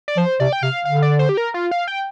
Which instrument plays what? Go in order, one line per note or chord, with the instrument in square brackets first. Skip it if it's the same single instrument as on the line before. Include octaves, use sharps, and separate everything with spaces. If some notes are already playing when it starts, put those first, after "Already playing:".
[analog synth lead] D5
[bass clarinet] F3 [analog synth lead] C5
[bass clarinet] C3 [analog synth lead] D5
[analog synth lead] G5
[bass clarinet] C3 [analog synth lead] F5
[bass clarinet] D3 [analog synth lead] F5
[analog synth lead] D5
C5
G4
A#4
F4
F5
G5